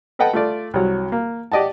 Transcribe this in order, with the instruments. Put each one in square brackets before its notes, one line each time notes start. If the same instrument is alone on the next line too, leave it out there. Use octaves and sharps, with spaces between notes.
[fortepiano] A4 B4 D#5 F#5 G5 A5
A3 F4 D5
C2 F#3
A#3
G4 D5 D#5 F#5 A5